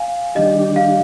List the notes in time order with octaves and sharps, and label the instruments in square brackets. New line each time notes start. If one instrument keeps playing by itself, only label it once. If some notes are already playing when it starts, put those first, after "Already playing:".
Already playing: [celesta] F5 G#5
[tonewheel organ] D#3 G3 D4 G4 [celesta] D#5
[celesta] F5